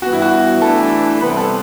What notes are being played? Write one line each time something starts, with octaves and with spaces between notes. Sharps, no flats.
G2 E3 B3 F#4
E4
F#4
E3 A3 D4 A4
C3 G3 B3 B4
A4